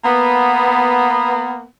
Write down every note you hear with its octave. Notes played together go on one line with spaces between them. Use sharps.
A#3 B3